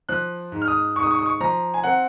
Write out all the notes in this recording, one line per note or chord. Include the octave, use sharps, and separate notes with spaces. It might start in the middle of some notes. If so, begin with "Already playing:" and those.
F3 F#6
G#2
F6
D#6
G#2 C#6
D#6
C#6
D#6
C#6
F3 A#5
G#5
C4 F#5